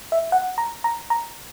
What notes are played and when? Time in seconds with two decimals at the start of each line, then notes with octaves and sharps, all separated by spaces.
0.12 E5
0.32 F#5
0.58 A#5
0.84 A#5
1.10 A#5